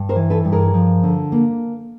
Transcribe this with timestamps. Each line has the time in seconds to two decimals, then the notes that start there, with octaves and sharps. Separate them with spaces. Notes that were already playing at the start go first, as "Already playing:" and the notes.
Already playing: G2
0.09 A#4 C5
0.16 E3
0.30 A4 B4
0.45 G2
0.52 G#4 A#4
0.74 F3
1.03 D3
1.32 A#3